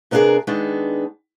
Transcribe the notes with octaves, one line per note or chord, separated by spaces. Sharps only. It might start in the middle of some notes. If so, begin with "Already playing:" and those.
C3 B3 D4 F#4 G#4 A#4
D#3 G#3 B3 D4